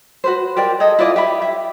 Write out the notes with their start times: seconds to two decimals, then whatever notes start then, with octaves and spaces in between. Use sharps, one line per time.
0.24 F#4 B4 C5
0.56 G4 A#4 D5 G5
0.80 G#4 A4 D#5
0.99 E4 F4 D5 D#5
1.16 G4 E5 B5
1.42 E5